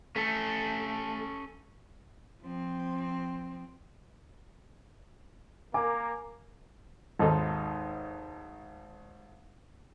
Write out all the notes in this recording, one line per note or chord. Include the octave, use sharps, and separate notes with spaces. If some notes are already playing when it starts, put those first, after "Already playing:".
A3 C#4 A4
F3 C4
A#3 A#4 G#5 D6
G#1 D#2 D#4 A4 D#5 A5